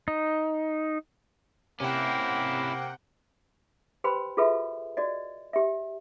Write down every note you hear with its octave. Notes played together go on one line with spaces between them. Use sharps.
D#4
C3 A#3 C#4 E4 F#5 G5
G4 B4 C5 G5 B5 C6
F4 F#4 G#4 A4 B4 E5
F#4 D5 D#5
G4 E5